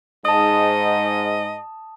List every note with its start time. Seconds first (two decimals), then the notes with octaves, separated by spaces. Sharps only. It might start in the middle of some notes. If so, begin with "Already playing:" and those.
0.25 G#2 D#5 A5 D#6